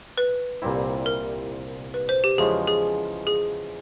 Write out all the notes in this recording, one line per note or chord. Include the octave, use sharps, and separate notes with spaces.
B4
C2 A#2 G3 C4 E4
A#4
B4
C5
G4
E2 C#3 F3 G#3 C#4 G#4
G#4
G#4